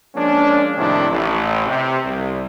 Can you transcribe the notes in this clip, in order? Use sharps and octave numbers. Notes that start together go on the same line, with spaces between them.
F3 G#3 A#3 C#4 D4
A2 C3 D#3 F3 D4 E4
A1
C3
C2